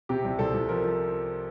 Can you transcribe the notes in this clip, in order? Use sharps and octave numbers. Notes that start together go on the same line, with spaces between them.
C3 G4
C2
C2 A4
C2
F3 A#4
F3